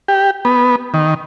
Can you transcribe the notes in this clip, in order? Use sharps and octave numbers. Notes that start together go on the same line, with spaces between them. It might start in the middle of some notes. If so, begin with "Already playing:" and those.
G4
B3
D#3